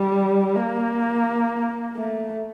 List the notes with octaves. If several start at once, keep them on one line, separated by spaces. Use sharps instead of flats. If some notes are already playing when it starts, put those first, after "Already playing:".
Already playing: G3
A#3
A3